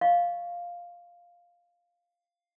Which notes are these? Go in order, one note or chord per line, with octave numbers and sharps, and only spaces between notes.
D#5 F5 C#6